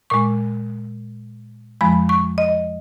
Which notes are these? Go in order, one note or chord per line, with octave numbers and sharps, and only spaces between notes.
A#2 G#3 C#6
F2 F3 G#3 B5
C#6
D#5